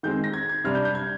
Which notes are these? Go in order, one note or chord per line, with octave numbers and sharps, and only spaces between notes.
D#3 G#3 C4 G6
A#6
G#6
G#6
C3 G3 D4 F6
G6
G6
G#6